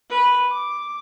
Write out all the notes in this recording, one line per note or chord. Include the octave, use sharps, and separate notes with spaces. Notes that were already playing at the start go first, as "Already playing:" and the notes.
B4
D6